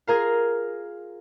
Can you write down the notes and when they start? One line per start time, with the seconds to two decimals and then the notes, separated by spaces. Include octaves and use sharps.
0.07 F4 G#4 A#4 F5